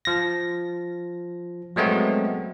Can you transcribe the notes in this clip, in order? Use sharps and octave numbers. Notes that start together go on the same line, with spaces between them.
F3 A#6
F#3 G#3 A3 B3 C4